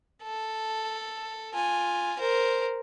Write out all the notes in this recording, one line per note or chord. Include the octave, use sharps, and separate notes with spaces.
A4
F4 G#5
A#4 C5